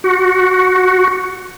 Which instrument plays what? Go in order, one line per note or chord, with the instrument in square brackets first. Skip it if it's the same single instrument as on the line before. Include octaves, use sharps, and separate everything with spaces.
[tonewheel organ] F#4